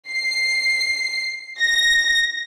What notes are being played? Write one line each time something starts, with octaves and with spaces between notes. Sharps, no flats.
C7
A#6